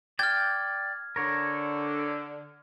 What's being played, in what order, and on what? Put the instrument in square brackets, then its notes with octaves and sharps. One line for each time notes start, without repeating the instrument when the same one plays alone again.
[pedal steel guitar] D5 G5 [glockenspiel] F6 G#6
[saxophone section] D3 [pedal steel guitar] A#4 C#5